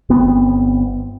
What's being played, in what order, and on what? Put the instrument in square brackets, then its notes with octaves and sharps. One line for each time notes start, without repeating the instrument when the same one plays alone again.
[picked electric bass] G1 B3 C4